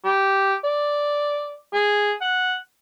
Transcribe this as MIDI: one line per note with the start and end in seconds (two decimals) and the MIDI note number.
0.05 0.55 67
0.64 1.59 74
1.73 2.13 68
2.21 2.56 78